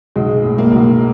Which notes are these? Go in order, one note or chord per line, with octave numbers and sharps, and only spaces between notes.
B1 G#3
A2
A#3
B1